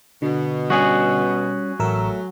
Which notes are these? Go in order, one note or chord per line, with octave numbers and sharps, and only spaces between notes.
B2 D3
G3 C#4 F#4 G#4
A1 F#3 A3 A#4 E6